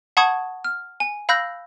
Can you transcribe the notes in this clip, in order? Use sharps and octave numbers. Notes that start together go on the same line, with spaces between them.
F#5 A5 B5 C#6 D#6 G#6
F6
G#5
F5 B5 E6 F#6 G6 A#6